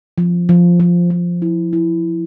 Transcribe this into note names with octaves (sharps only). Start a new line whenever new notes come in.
F3
F3
F3
F3
E4
E4